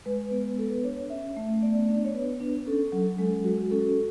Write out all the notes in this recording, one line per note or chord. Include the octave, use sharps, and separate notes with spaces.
G#3 B4
B3
B3 A4
B4
D4 C#5
C#4 E5
A3
B3 D5
D4
C#5
B3 B4
D4
C#4 A4
F#3
G#3 A4
F#4
C#4 A4